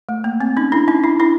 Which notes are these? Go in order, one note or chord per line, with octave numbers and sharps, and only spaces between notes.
A3
A#3
C4
C#4 D#4
D4 E4
C#4 D#4
D4 E4
D4 E4